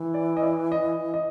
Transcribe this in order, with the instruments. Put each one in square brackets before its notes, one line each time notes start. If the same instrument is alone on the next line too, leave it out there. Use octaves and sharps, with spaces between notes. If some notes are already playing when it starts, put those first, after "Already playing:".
Already playing: [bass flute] E3
[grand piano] D5
D#5
D5
D#5
D#5